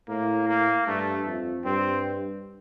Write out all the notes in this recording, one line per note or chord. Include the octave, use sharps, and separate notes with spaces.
A2 A#3
A#3
G2 A3
F2
G2 C4